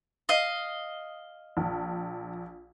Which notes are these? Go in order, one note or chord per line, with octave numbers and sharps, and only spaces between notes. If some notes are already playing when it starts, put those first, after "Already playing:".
D#5 F5
A#1